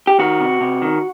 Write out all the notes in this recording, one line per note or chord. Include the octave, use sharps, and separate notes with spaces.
G4
D#3 F#4
C3
C3
D#3